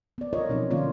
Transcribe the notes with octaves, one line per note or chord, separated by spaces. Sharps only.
B3 D5
F4 A#4 C#5 D#5
B2 F3 F#3 C4 C#4 D#4
D3 A#3 C#4 F4 C#5 D5